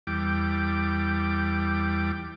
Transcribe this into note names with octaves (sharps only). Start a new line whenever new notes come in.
E2 G3 D6